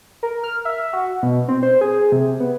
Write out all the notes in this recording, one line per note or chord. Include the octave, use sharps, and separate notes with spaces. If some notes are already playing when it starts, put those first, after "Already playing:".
A#4
F6
E5
F#4
B2
C4
C5
G#4
C3
B3